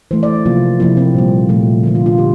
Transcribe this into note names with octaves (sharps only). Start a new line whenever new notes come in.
E3 A3 C5
D5
C3 F3 A#3 F4
C3 F3 A#3 E4
C4
A#2 G3 A#3
A#2 F3 A3
D3 F3 A#3
F4
F4
D3 G4